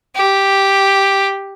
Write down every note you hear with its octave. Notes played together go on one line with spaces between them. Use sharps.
G4